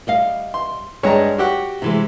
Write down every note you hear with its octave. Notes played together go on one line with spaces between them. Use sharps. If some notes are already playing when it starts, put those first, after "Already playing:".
G3 D#5 F5
C6
G2 G#3 C#5 A#5
F#4 G4 F#5
C3 E3 G#3